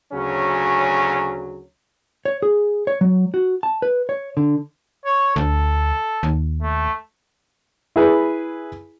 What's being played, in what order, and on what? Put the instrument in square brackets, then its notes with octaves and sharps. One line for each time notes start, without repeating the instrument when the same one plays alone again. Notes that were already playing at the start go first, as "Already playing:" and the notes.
[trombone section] D2 C#3 F#3 C#4
[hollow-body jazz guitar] C#5
G#4
C#5
F#3
F#4
A5
B4
C#5
D3
[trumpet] C#5
[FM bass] D2 [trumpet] A4
[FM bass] D#2
[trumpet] A3
[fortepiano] E4 G#4 B4